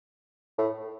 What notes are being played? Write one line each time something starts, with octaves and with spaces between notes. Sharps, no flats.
A2